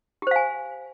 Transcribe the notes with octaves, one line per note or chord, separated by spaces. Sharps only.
G4 C5 F5 G#5